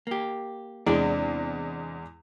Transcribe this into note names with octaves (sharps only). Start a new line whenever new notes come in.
A#3 G4
E2 C3 G#3 D4 D5